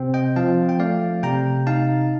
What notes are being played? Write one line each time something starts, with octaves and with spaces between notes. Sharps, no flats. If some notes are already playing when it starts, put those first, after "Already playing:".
Already playing: C3 C4
D#5 G5
F3 F5 A5
G5
A3 D5 F5
C3 G5 A#5
D#4 F5 A5